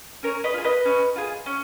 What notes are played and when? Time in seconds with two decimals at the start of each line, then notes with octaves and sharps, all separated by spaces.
0.23 C#4 A#4 C#5
0.44 B4 D#5
0.54 F4 G#4
0.64 B4 D#5
0.85 C#4
1.16 F4 G#4
1.46 C#4